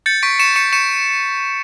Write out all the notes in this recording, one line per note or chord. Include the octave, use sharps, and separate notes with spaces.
G6 A6 C#7
C#6 B6 D7
C#6 C#7 E7
C#6 C#7 E7
C#6 C#7 E7